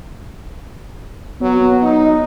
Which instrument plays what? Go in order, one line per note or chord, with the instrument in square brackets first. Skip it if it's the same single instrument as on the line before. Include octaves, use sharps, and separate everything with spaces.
[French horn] F#3 [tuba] B3
[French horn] D#4